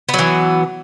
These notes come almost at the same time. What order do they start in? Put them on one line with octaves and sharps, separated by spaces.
B3 F#3 E3